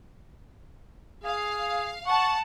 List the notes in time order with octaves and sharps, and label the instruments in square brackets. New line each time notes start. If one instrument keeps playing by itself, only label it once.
[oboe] G#4 [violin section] F5
[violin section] F#5 A5 [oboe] C#6